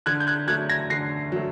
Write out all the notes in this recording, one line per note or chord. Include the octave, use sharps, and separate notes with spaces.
D3 F#6 G#6
G6
F#6 G#6
F#3 A3 F#6 G#6
G#6 A#6
D3 A#6 C7
F#3 A3